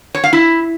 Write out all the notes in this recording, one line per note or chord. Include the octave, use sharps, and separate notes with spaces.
C#5
F5
E4